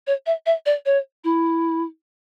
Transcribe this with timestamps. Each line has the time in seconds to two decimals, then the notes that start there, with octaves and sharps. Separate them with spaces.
0.07 C#5
0.26 E5
0.46 E5
0.66 D5
0.86 C#5
1.24 E4